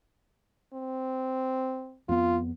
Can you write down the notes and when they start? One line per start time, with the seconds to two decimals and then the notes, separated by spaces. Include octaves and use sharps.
0.73 C4
2.09 F2 B3 F4